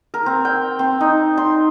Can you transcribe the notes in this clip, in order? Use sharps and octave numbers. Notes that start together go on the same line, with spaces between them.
A#4
C4
G5
C4
D#4
C6